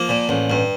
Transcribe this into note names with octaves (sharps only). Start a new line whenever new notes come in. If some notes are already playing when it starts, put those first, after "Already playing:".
Already playing: F3 A#3
A#2
A1
G2